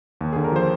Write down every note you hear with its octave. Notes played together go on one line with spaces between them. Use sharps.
D#2
D3 G#4
A#4
F3 C5